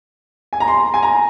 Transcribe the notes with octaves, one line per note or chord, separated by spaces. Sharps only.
G#5
A#5
C6
G#5
A#5